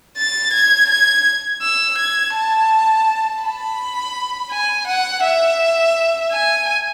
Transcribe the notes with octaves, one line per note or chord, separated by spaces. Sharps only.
A6
G#6
G#6
E6
G#6
A5
B5
G#5
F#5
E5
G#5